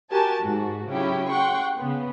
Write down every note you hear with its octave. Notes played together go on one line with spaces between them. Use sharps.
F#4 G4 A#4 G#5 A5
G#2 F#4
C#3 F#3 C#4 E4 G4
F#5 G5 C6 C#6
C#3 B3